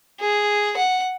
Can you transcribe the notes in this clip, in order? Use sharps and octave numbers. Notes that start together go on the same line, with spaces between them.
G#4
F#5